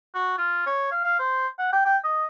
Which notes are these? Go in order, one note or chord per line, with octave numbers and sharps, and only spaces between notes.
F#4
F4
C#5
F5
F5
C5
F#5
G5
G5
D#5